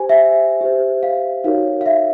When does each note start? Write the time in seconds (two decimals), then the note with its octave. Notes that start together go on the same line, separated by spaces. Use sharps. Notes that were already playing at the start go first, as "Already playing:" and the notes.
Already playing: G4 C5 G#5
0.09 E5
0.61 G4 C5
1.03 F5
1.44 D#4 F#4 A#4 C#5 F5
1.81 F5
1.86 E5